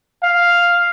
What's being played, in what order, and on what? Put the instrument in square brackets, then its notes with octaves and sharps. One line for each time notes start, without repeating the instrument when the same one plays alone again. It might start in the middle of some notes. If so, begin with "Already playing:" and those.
[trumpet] F5